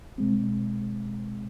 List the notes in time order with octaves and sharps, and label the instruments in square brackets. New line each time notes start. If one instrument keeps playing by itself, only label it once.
[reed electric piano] B2 G#3 C4